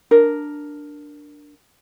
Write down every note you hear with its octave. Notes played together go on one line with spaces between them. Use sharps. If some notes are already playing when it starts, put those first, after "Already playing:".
D4 A#4